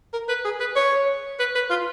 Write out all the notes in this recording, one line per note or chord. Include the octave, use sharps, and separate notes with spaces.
A#4
B4
G#4
B4
C#5
B4
B4
F4